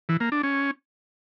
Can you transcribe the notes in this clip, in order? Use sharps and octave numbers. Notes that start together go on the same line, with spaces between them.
E3
A#3
D4
C#4